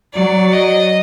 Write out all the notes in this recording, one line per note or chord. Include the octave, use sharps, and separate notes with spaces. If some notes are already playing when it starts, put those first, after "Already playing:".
F#3 D5
D#5